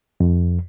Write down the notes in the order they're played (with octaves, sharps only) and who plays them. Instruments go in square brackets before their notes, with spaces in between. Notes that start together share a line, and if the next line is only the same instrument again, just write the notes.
[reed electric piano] F2